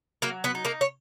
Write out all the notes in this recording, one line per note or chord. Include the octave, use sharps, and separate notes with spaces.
F#3 A#3 A#4
B3 B4
D#4
A#3 A#4
C#5